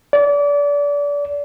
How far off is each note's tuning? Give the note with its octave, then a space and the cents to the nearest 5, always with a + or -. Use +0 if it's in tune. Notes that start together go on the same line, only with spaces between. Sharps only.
D5 -30